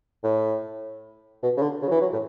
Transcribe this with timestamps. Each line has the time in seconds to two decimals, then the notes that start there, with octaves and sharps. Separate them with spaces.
0.24 A2
1.43 B2
1.57 C#3
1.62 D3
1.82 C#3
1.88 F#3
1.91 E3
2.01 F#3
2.12 A2